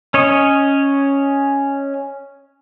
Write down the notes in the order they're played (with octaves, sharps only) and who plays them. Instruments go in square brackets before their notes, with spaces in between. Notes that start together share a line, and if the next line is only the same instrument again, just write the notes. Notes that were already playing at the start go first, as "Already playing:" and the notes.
[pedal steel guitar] C#4 C#5 D#5